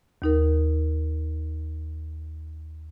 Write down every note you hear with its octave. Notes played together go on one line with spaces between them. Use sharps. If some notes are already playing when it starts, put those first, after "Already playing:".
D#2 D#4 A#4